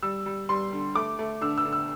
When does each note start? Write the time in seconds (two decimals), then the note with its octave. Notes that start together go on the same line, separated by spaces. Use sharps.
0.03 G3 E6
0.26 G3
0.49 G3 C6
0.73 D3
0.95 A3 D6
1.19 A3
1.41 D3 E6
1.58 E6
1.65 D3
1.73 E6